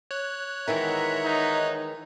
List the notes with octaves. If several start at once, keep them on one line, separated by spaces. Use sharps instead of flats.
C#5 F#6
D#3 E3 G#3 E5 F#5 A#5
D#4